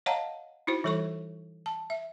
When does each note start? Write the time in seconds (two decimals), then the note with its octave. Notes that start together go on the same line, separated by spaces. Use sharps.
0.06 C#5 D#5 F5 F#5 A5 A#5
0.67 D#4 E4 F#4 C5
0.84 E3 G3 A4 C#5 C#6
1.66 A5
1.90 E5